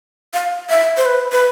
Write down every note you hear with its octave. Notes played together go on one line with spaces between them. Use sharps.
F5
E5
C5
B4
B4